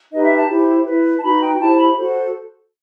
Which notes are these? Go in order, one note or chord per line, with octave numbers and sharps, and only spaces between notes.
D#4 G4 B4 D#5
E5
A5
E4 G4 C5
E4 B4
A5
D#4 F#4 B4 B5
G5
E4 G4 C5 A5
B5
F#4 A4 C5